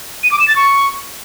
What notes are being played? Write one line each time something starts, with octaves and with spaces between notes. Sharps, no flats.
D#7
D6
E7
A6
C#6